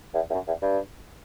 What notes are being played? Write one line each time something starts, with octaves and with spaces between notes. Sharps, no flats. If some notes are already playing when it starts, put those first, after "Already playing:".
E2
E2
F#2
E2
G2